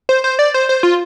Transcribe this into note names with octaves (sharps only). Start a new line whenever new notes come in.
C5
C5
D5
C5
C5
F4